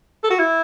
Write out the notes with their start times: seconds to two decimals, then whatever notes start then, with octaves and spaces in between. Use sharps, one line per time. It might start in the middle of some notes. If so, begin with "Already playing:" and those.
0.24 A4
0.30 F#4
0.39 E4